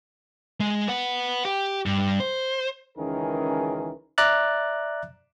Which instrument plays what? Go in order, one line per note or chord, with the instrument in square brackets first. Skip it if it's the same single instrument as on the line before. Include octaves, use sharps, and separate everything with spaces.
[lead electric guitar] G#3
B4 F#5
G4
G2
C5
[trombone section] C#2 D#3 E3 C#4 G#4 A#4
[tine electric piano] D5 E5 A#5 D6 F#6 A6